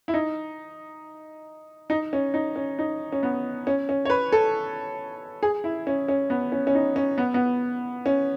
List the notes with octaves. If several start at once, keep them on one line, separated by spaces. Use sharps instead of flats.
E4
D#4
D#4
C#4
D#4
C#4
D#4
C#4
B3
C#4
C#4
C#5
B4
A4
G#4
E4
C#4
C#4
B3
C#4
C#4
D#4
C#4
B3
B3
C#4